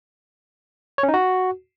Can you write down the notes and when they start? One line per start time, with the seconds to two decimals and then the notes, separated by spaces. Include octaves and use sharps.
0.98 C#5
1.03 C#4
1.09 D#4
1.14 F#4